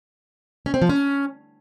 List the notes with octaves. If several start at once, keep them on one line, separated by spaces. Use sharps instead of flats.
C#4
C4
F3
C#4